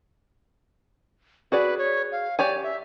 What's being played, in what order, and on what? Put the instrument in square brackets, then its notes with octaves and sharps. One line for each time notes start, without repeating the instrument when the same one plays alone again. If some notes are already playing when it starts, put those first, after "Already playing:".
[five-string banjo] F#4 G#4 D5 [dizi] B4
[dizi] C#5
F5
[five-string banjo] G4 C#5 G#5 [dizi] D5
[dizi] E5